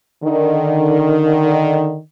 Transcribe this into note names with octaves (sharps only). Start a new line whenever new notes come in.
D3 D#3